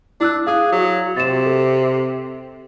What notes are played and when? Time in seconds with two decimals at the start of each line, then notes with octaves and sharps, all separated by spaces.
0.21 D4 E4 E6 F#6
0.47 G#4 F5 D#6
0.73 F#3
1.16 C3 A6 E7
1.46 A4